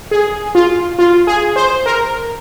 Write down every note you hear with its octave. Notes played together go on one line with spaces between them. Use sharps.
G#4
F4
F4
G#4
C5
A#4